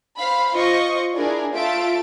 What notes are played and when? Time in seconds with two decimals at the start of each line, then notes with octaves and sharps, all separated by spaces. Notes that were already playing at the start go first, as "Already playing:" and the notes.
0.18 C5 F5 B5
0.56 F4 C5 D#5 C#6
1.15 D4 E4 G#4 A#4 D5
1.55 A3 F4 E5 A5 D7